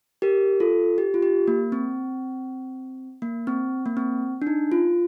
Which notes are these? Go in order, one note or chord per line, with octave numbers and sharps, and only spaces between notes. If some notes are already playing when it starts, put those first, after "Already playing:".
G4 A#4
F4 A4
G4
F4
G4
A#3
C4
A#3
C4
A#3
C4
D4
D#4
F4